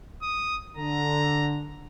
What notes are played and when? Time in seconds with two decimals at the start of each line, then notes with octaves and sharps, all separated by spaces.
0.22 D#6
0.77 D3 A#5